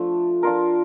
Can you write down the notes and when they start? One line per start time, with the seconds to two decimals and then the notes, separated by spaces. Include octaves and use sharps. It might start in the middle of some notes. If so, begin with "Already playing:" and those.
Already playing: F3 A3 D4
0.43 D4 F4 A#4